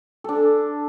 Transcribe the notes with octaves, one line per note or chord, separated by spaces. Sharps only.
D4 A4